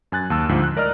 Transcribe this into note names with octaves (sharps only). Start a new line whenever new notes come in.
F#2 G#5 F#6 A6
D#2 A5 E6
D2 G#2 F3
F#6
A#4 D5 D#5 A#5 F6